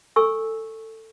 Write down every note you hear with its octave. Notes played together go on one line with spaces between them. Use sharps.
A4 G#5 C#6 E6